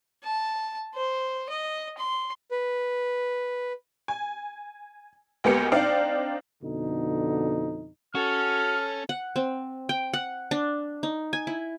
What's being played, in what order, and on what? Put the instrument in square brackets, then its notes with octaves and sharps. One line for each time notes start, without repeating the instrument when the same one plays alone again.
[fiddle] A5
C5
D#5
C6
[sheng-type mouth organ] B4
[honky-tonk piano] G#5
D2 G#3 A#3 B3 G4 C#7
C4 D4 D#4 D5 F5 G5
[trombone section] F2 B2 D3 D#4
[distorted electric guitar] C#4 [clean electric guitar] F#4 [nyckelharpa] A4 [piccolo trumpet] F6
[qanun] F#5
C4
G5
F#5
D4
D#4
G#5
E4